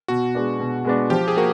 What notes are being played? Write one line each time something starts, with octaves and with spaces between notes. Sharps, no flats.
B2 F#4
G#3 B3 D4
B2
G#3 B3 D4
F3 G4
G#4
A#3 F#4